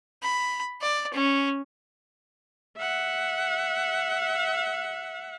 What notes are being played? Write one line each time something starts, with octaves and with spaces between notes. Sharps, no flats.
B5
D5
C#4
E5 F#5